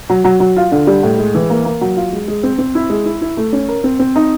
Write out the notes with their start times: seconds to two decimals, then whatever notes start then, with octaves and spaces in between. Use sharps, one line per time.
0.10 F#3
0.24 F#3
0.40 F#3
0.57 F4
0.72 D3
0.87 G3
1.03 A2
1.18 G#3
1.35 E3
1.50 A#3
1.65 A#3
1.81 F#3
1.96 F4
2.13 G#3
2.28 G#3
2.43 C4
2.58 C4
2.75 E4
2.90 G#3
3.05 E4
3.21 E4
3.37 A3
3.53 C#4
3.69 A#4
3.84 C4
3.99 C4
4.16 D#4